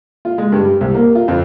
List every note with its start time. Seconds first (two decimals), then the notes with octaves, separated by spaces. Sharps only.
0.25 F4
0.38 G#3
0.52 G2
0.65 G3
0.81 C2
0.95 A#3
1.15 F4
1.28 F2